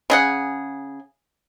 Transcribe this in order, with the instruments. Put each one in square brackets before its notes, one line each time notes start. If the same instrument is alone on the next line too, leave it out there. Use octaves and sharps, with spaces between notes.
[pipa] C#3 G#4 F#5